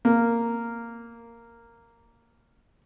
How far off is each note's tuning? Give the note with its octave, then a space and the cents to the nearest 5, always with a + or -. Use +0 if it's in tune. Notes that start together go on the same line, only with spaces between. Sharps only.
A#3 -10